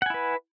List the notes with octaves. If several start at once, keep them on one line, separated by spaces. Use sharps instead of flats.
E4 B4 F#5 G#5